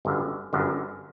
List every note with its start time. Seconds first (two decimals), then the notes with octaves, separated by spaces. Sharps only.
0.05 G1 F#2 D3
0.53 G1 F#2 D3